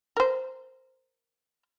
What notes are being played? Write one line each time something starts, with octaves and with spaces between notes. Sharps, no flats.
A#4 C5